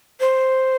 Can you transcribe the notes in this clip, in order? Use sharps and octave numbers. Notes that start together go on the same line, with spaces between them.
C5